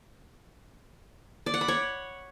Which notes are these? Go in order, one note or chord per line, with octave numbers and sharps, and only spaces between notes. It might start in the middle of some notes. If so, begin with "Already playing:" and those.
D5
F#5
B5
C#5